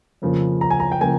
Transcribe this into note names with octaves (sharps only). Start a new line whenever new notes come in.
F2 C#3 F3 A#3
A#5
G#5
A#5
G5
C#3 F3 A#3 G#5